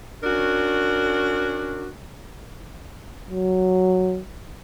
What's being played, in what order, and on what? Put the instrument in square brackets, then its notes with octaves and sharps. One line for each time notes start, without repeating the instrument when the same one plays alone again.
[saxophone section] C#4 D4 F#4 A#4
[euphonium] F#3